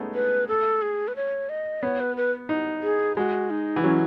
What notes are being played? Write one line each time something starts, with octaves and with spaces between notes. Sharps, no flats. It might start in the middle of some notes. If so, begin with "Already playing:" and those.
Already playing: G#3 A3 B3 C#4 D#4
B4
A4
G#4
B4
C#5
D#5
B3 C#5
B4
B4
D#4
G#4
G#3 F#4
D#4
E3
F#3 C#4